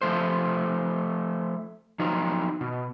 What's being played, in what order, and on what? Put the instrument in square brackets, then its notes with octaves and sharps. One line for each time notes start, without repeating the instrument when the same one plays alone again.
[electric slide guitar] F3 A3 C5
F3 F#3 D#4
B2